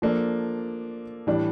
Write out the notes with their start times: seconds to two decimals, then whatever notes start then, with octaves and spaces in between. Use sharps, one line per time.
0.02 F3 A#3 D4 A4
1.27 A2 E3 G3 D4